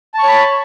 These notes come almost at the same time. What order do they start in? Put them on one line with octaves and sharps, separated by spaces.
A5 C#6 C#5 B5